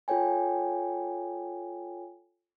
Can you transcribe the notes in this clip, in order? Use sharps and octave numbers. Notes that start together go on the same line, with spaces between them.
F4 A4 C#5 G5 G#5